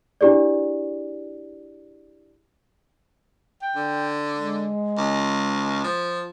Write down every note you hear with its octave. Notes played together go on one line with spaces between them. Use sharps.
D4 E4 G4 G#4 D5
G5
D3
G#3
C#2
F3